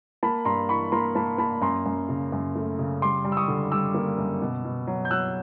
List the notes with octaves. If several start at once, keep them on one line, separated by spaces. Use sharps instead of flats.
A#3 A5 B5
G2 A#5 C6
E3 B5 C#6
A#3 A#5 C6
A#3 A5 B5
A#3 A5 B5
F#2 A#5 C6
F#2
C#3
F#2
A3
C#3
G3 C6 D6
G3
E6
C#6 D#6
D3
G3 D6 E6
A#3
F#2
B2
B2
F#3
G6
F#3 E6 F#6